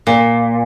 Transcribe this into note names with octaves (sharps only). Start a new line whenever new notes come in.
A#2